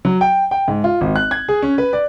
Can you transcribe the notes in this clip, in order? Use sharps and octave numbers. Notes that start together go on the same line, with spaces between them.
F#3
G5
G5
G#2
F4
G#1
F#6
G#6
G#4
C#4
B4
D5